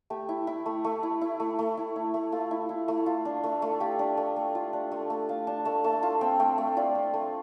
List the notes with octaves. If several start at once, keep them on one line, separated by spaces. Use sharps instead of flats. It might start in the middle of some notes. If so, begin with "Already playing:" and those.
A3 G4
E4
E4
A3
A3
E4
E4
A3
A3
E4
E4
A3
A3 F4
E4
E4
A3
F4
D4
A3
A3
F4 G4
D4
A3
A3
F4
D4
A3
A3
F4 F5
D4 A5
A3 A5
A3 A5
F4 A5
C4 G5
A3 G5
A3
F4 D5
C4
A3